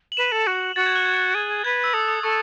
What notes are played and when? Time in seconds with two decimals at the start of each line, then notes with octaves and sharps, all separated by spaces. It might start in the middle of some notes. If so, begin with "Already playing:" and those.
0.12 F#7
0.17 B4 E7
0.32 A4
0.47 F#4
0.76 F#4 A6
0.86 G#6
0.96 F#6
1.06 G#6
1.35 G#4
1.64 B4 G#6
1.84 E6
1.94 A4 D#6
2.08 D#6
2.23 A4 C#6